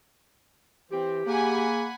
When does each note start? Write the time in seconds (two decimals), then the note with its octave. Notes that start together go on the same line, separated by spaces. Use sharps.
0.92 E3 C4 G4
1.27 A#3 G#4 F#5 G#5 B5